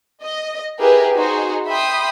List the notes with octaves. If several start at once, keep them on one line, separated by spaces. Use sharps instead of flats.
D#5
E4 G4 G#4 A#4 B4
D#4 F#4 G#4 C5
E5 G5 B5 C6 D#6